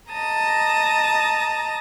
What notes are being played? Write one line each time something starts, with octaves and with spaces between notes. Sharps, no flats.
D#5 A5 A#5 D#6